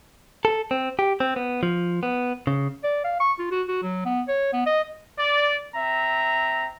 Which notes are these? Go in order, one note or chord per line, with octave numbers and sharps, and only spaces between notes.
A4
C4
G4
C4
B3
F3
B3
C#3
D5
F5
C#6
F4
F#4
F#4
F#3
B3
C#5
B3
D#5
D5
C4 E5 A#5